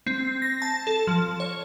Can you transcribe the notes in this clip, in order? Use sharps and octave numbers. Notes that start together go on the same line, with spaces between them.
C4
A#6
A5
A4
F3
C#5